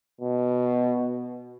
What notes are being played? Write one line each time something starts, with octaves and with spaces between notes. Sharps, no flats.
B2